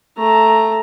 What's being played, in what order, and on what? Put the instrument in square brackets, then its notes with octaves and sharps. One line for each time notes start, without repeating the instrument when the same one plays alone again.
[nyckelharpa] A3 A#5